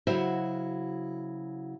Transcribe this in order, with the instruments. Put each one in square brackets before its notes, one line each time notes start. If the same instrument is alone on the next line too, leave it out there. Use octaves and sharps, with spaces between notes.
[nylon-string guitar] C#3 F#3 E4 F#4 C5 E5